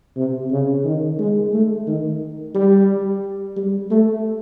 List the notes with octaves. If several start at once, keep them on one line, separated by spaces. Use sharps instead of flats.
C3
C#3
D#3
G#3
A3
D#3
G3
G3
A3